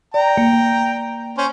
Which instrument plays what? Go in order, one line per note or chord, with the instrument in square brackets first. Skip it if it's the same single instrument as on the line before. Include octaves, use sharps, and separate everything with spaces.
[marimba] D5 [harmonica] G5 A#5
[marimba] A#3
[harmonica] C#4 C5